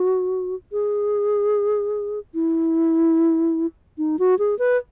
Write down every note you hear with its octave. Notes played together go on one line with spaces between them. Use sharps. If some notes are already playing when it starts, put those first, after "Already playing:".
Already playing: F#4
G#4
E4
D#4
F#4
G#4
B4